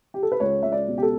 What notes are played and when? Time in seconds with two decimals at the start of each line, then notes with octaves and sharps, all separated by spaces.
0.14 G4
0.23 A4
0.32 B4
0.40 C#2 C#5
0.63 C#2 E5
0.72 D5
0.88 B2
0.98 G4
1.02 A4